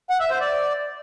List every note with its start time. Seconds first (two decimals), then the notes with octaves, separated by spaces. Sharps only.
0.10 F#5
0.20 E5
0.30 C5
0.40 D5